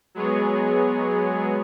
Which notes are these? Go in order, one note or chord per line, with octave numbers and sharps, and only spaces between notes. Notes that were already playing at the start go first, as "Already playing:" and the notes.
F#3 G#3 B3 G#4 C#5